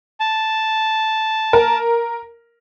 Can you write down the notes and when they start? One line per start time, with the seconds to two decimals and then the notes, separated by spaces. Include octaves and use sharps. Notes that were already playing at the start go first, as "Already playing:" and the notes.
0.20 A5
1.53 A#4